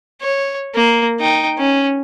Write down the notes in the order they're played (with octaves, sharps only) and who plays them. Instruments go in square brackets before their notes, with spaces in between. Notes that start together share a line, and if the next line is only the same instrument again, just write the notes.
[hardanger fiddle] C#5
A#3
D#4 G5
C#4